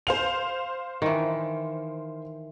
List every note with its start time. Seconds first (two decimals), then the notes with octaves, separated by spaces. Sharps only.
0.07 C5 F5 F7
1.02 D#3 E3